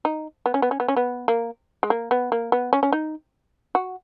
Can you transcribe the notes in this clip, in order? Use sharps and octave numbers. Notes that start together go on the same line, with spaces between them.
D#4
B3
C#4
B3
C#4
B3
C#4
B3
A#3
G#3
A#3
B3
A#3
B3
C#4
C#4
D#4
F#4